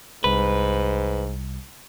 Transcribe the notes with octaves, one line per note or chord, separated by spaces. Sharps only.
C2 G#2 B4